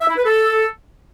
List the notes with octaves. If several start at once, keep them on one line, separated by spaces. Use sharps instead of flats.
E5
E4
B4
A4